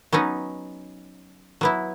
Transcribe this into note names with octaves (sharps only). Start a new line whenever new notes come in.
F#3 B3 C#4 D#4
F#3 B3 E4